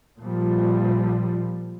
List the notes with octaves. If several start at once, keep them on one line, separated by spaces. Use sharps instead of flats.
A#2 F3 G3